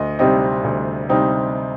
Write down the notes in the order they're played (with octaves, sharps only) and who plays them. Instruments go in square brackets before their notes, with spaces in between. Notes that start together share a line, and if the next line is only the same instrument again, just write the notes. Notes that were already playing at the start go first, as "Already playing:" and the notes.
Already playing: [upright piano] D2 D#5
C3 G3 C4 D#4 D#5
D2
C3 G3 C4 D#4